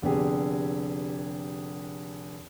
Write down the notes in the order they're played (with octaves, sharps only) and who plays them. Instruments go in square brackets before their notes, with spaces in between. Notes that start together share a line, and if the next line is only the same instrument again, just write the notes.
[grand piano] F1 D3 B3 G4 G#4